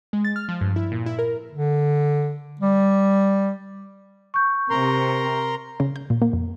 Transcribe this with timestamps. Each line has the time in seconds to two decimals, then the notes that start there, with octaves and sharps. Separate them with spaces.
0.13 G#3
0.25 A6
0.36 F6
0.49 F3
0.61 G2
0.76 E4
0.92 A#2
1.06 E4
1.19 A#4
1.52 D3
2.61 G3
4.34 C#6 G6
4.70 C3 A#4 A#5 C6
5.80 C#3
5.96 G6
6.10 A#2
6.22 A#3
6.33 F2